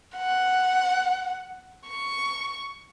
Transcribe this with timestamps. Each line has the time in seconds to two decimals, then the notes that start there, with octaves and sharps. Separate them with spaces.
0.17 F#5
1.89 C#6